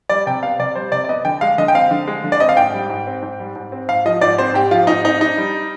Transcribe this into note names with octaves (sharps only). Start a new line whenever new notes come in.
G3 D5
C3 G5
B3 F5
C3 D5
G3 C5
C3 D5
D5
B3 D#5
D3 G5
G#3 F5
D3 D#5
G5
C4 F5
D3
G#3
D3
D5
C4 D#5
F5
G#2 G5
G3
G#2
C4
G#2
G3
G#2
C4
G#2 F5
F3 D#5
G#2 D5
C4 C5
G#2 G4
F3 F4
G#2 D#4
C4 D#4
D4 D#4
G3